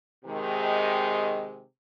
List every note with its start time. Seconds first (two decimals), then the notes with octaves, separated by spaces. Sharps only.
0.24 C3 D#3 G#3